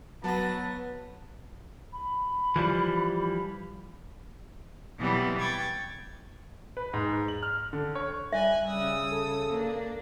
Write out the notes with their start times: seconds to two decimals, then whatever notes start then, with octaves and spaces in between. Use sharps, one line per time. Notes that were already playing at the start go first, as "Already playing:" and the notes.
0.24 F#3 B3 A5 A#6
1.93 B5
2.56 E3 F3 G3
4.98 B2 E3 F#3 G3 B3 C4
5.38 G5 C#6 G#6 A6
6.77 B4
6.93 G#2
7.28 F#7
7.43 F6
7.73 D3
7.95 C#5
8.33 G3 E5 G#5 F#6
8.67 C#3 G3 D#6 E6
9.11 A4
9.49 A#3 D4